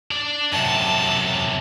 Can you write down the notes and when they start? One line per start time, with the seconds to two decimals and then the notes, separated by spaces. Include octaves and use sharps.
0.12 D4 D5
0.52 F#2 C3 A5